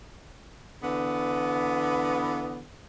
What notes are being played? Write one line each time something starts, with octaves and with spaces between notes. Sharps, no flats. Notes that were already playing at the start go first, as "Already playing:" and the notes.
D3 E3 B3